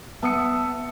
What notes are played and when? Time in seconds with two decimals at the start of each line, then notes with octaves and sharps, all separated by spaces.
0.23 B3 E5 A5 D#6 C#7